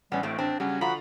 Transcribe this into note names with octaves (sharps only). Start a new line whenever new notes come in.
A1 G3 B3 C#4
A2 A3 C4
C4 D4
C#3 F#3 G3 C#4 F#4
D3 F3 F4 F#4 A#5 B5